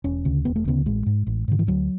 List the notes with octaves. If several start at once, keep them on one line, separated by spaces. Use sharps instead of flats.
E1 C#4
D2 C#3
E1 B3
A3
D2 C#3 B3
A1 G#3
G#2
A1
G#2 D3
E3
D2 F#3